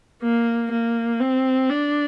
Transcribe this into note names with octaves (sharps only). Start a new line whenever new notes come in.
A#3
A#3
C4
D4